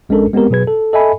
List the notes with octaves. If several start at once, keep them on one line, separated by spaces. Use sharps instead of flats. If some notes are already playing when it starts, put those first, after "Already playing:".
A#1 G#3 C#4 D4 A4 A#4
G#3 B3 C4 G4 A#4
B2 F#3 G#4 B4 G#6
A4
A4 D#5 E5 G#5 B5